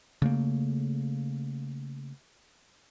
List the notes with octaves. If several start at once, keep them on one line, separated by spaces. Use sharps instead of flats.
C#3 A3 A#3